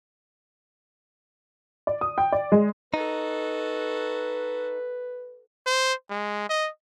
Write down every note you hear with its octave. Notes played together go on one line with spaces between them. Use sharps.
D5
D#6
G5
D5
G#3
D#4 F#4 A4 B4
C5
G#3
D#5